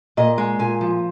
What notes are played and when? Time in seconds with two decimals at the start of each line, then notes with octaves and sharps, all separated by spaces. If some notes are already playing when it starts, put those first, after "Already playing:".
0.17 A#2 D#5
0.38 G#3
0.59 A#2 G#5
0.81 F3